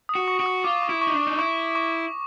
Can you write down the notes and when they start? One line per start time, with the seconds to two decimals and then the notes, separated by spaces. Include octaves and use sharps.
0.09 D#6
0.15 F#4
0.28 C#6
0.40 F#4
0.46 D#6
0.64 F4 D6
0.83 C#6
0.89 E4
1.01 C#6
1.07 D#4
1.14 D4
1.27 D#4
1.38 E4 C#6
1.75 C#6